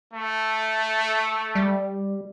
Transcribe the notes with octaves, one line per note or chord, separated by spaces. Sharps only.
A3
G3